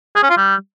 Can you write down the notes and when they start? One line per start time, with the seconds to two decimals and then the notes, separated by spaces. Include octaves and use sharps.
0.16 G#4
0.23 C#4
0.30 F4
0.37 G3